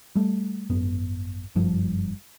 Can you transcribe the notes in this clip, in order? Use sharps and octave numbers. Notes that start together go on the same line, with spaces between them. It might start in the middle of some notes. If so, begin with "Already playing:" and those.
G3 A3
G#1 F#2 B3
F#1 G2 F3